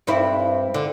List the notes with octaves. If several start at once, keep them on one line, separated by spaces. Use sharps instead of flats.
G2 C4 E4
D3